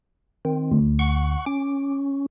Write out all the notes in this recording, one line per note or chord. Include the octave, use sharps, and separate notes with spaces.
D#3 C4
D2
F#5 C#6
C#4 D6